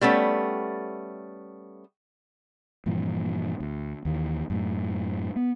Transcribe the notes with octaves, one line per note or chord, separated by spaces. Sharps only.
G3 A3 B3 C#4
G2 A#2 E3 F3
D2
D#2 D#3 E3
F#2 A2
B3